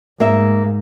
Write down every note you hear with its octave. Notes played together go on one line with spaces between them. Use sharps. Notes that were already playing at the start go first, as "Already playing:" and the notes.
G#2 A#3 E5